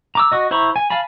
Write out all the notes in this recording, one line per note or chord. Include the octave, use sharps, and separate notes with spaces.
A#5 D6 E6
F#4 D#5
E4 C5 A#5 B5 C#6
G#5
F5 G#5 A5 B5